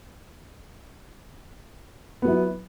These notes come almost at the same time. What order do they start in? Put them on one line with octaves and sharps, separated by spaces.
B3 F#3 E4